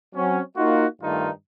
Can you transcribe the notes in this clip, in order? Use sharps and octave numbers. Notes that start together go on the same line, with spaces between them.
F#3 C4 C#4
A#3 D#4 F4 F#4
G2 D#3 A3 D#4 F4